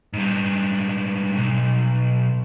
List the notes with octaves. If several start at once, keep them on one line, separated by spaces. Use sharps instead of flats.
G#2 G3
B1